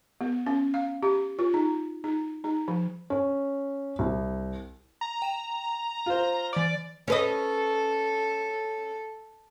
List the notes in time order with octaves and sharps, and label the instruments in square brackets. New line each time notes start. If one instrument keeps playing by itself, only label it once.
[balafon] B3
C#4
F5
G4
F4
D#4
D#4
D#4
F3
[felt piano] C#4
C2
[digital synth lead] A#5
[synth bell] G5 E7
[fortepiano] F4 C5
[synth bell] E3 A6 [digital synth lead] D5
[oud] C#4 B4 D#5 [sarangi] A4